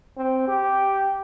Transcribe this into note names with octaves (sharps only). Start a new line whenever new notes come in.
C4
G4